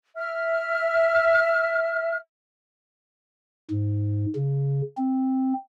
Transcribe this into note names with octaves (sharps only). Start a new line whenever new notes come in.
E5 F6
G#2
C#3
C4